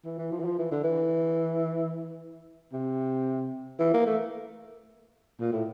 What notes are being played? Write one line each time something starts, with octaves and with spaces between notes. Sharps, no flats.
E3
E3
F3
E3
F3
E3
D3
E3
C3
E3
A#3
A3
A#2
A2